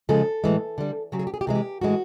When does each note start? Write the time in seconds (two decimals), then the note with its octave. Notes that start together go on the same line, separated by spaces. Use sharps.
0.09 C#3 F3 G#3 A4
0.44 A2 E3 G#3
0.78 D3 G3
1.12 C#3 F#3 G4
1.19 G#4
1.27 G4
1.34 G#4
1.41 G4
1.47 C3 E3 G#3 G#4
1.55 G4
1.81 A2 E3 G#3 F#4